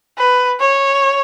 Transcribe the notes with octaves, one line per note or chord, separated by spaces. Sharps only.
B4
C#5